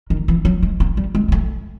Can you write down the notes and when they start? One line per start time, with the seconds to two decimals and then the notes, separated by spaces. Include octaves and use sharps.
0.10 D#3
0.28 E3
0.45 F#3
0.63 G#3
0.80 A#3
0.97 G3
1.15 G#3
1.28 A#3
1.32 A3